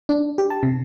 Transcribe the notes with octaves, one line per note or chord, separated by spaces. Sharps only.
D4
G4
A5
C3